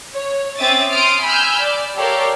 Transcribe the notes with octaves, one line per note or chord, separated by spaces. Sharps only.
C#5
C4 C#4 E5 D6 D#6 A6
C6 D#6 F6 D7
G#5 B5 E6 F6 G6
D5
G4 A4 A#4 C#5 D5 F5